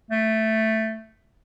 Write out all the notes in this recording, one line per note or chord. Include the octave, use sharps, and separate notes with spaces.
A3